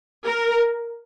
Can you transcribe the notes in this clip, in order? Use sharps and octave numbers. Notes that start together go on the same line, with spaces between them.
A#4